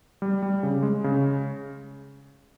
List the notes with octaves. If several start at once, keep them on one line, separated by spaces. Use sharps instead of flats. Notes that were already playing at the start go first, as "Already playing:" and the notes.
G3
G3
C#3
G#3
C#3